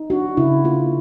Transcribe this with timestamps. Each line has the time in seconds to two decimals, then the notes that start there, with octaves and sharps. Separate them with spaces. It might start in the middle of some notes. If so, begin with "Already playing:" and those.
Already playing: D#4
0.10 D4 F#4
0.37 C#3 E4
0.64 A#3 F4